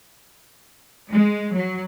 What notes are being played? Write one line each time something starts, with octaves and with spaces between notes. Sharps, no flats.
G#3
F#3